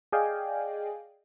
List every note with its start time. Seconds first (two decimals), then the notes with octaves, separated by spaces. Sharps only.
0.13 G#4 D5 D#5 F5 G5 G#5